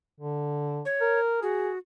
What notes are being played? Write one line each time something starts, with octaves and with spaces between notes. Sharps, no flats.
D3
C#5
A#4
F#4 G#4